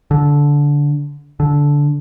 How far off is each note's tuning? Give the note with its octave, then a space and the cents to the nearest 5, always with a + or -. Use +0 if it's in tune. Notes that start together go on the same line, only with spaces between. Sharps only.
D3 -15
D3 -15